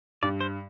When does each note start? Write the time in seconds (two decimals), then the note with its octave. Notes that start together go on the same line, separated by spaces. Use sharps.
0.22 G2 D5
0.41 C5